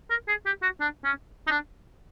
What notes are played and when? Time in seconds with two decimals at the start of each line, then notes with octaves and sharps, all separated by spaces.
0.10 A#4
0.28 G#4
0.46 G4
0.62 F#4
0.80 D4
1.04 C#4
1.47 D#4
1.50 D4